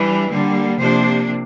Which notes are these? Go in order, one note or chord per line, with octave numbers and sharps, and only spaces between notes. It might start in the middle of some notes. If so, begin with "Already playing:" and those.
Already playing: E3 G3 D4
D3 G3 A#3
C3 F3 A#3 D4 C5